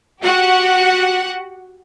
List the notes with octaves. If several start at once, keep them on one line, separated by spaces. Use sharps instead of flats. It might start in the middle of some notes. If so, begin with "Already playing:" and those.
F#4 G4 F#5